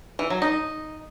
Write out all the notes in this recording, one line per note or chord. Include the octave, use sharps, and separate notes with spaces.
E3
F#3
D#4